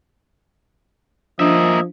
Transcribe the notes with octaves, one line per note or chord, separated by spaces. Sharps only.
F3 A#3 D4 D#5 E5